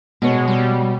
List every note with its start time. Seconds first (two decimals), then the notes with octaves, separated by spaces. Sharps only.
0.22 B2 G#3 C#5
0.48 G3